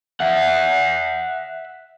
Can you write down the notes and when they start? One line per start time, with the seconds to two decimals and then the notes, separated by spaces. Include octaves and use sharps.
0.20 E5 F#5